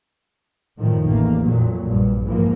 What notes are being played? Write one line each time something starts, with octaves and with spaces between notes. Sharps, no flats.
F#2 A2 D#3 F3
A1 E2 A#3
F2 A#2 F#3
A#1 G2
F2 G#2 E3 F3 A#3